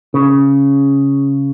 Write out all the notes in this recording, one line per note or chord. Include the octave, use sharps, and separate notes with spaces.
C#3